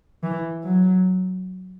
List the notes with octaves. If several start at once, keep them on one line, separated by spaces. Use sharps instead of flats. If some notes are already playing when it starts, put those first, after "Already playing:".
E3
F#3